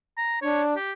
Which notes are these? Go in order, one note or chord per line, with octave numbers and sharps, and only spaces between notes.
A#5
D4 C#5
G4